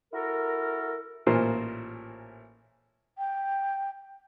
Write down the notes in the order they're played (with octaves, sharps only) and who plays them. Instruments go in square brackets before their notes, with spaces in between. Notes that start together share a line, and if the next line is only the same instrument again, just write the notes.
[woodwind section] E4 F#4 A4 A#4
[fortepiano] A1 A#2 F4 A#4 C5
[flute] G5